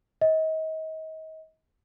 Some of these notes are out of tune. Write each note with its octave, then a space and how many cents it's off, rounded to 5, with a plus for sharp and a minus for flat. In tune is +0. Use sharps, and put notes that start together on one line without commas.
D#5 +35